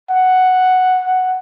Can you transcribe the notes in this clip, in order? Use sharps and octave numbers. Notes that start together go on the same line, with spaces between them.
F#5